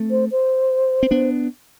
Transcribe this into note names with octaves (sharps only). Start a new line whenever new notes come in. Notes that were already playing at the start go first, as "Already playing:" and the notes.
Already playing: A3 C4
C5
C5
C4
B3 D4